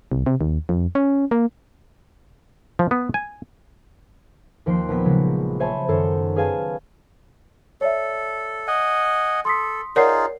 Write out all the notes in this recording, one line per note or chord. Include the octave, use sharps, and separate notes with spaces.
C2
C3
D#2
F2
C#4
A#3
F3
B3
G#5
D#2 F3 G5 C6 F#6 C7
A#1 B3 B6
C#3 F#3 G#3
C5 C#5 E5 G#5 A5 B5
F#2 D#3 A4 C5 C#5
C#4 G#4 B4 F5 G#5 A5
A4 C#5 D5 E5
D#5 F#5 G#5
A4 C6 D#6 B6
D#4 F4 G#4 A#4 C#5 D5 F#5 C7